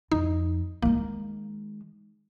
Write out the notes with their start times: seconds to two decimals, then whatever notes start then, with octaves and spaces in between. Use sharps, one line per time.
0.12 F2 D#4
0.83 D#3 G#3 A#3